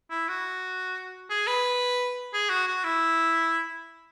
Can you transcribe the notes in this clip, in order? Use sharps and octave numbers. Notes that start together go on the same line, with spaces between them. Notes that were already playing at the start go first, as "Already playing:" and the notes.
E4
F#4
G#4
B4
G#4
F#4
F#4
E4